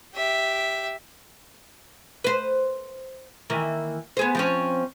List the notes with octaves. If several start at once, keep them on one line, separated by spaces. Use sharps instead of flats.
G4 E5
B4 C5
D#3 E3 A#3
B3 G#4 C5
F3 C4 C#4